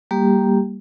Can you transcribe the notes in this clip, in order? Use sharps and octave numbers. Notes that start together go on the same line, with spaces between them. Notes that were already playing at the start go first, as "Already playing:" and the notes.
G3 A#3 G4